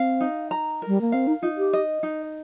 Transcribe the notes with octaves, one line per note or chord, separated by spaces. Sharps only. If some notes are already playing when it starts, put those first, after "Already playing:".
Already playing: C4 F5
D#4
A#5
A#4
G3
A#3
C4 F5
D#4
D#4 F4
G4
D#5
D#4